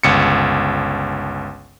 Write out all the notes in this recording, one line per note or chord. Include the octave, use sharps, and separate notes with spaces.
G1 C#2 C#7